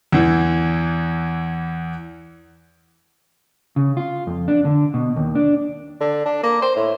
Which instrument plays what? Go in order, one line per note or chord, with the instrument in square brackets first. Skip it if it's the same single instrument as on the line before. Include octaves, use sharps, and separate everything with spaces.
[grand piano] E2 E3
[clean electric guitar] C#3
F4
F2
D4
D3
B2
D#2
D4
[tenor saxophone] D3
D4
A#3
C5
A2